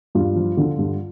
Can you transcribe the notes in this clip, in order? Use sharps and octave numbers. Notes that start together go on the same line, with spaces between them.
G2 F4
F3
D3
G2